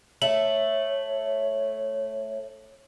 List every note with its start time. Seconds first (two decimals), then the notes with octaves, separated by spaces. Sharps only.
0.22 A3 C#5 E5 F#7